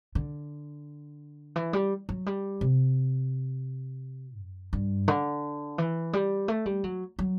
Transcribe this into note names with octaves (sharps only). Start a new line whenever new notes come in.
D3
E3
G3
F#3
G3
C3
F#2
G2
D3
E3
G3
A3
G3
F#3
F#3